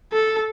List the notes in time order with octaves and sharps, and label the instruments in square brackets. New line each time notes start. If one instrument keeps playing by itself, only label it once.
[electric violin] A4